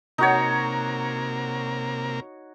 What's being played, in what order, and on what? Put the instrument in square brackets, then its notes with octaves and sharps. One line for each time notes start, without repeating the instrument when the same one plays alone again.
[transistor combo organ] C3 A#3 A#4 [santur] D#4 F#4 C#5